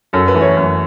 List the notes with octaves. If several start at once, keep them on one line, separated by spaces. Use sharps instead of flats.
F#2 A4
B4
E3 A3
C#5
F#2